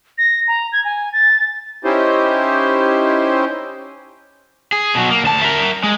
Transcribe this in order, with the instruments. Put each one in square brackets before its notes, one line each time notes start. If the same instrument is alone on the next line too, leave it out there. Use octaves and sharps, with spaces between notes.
[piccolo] A#6
A#5
G#6
G#5
A6
[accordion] C#4 D#4 E4 G4 C5
[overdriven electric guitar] G#4
B2 F#3
A#3
D2 A5
A#4 E5
G#3